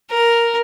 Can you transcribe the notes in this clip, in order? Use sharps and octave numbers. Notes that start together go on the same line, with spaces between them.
A#4